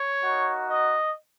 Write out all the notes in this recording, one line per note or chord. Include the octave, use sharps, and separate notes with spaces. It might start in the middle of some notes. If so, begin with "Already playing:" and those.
Already playing: C#5
A#3 D#4 F#4
D#5